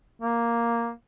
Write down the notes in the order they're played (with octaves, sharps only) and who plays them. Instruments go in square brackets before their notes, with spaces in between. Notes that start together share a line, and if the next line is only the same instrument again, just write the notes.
[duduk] A#3